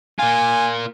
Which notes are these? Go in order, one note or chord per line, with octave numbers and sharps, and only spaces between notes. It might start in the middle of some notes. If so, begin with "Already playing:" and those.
A#3 F4 G#5